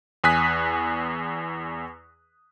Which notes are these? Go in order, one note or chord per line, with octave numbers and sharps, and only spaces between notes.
E2 G#5 D#6 F#6 B6